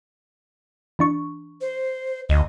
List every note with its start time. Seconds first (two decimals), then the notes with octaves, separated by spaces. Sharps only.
0.99 E3 D4 C#6
1.61 C5
2.29 D2 D#5